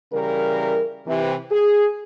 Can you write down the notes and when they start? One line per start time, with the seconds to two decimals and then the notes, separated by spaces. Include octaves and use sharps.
0.13 C#3 E3 G3 A#4
1.07 C3 E3
1.51 G#4